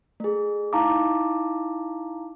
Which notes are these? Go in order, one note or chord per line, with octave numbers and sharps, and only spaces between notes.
A3 G#4
D#4 E4 F5 A5 A#5 D6